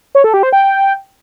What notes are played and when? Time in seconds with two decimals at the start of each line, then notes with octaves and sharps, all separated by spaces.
0.15 C#5
0.24 A4
0.34 G4
0.43 C5
0.53 G5